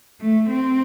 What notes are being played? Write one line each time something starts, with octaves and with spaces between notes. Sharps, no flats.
A3
C4